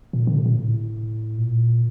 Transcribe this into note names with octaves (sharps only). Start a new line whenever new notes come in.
A#2
D3
C3
A#2
A2
A#2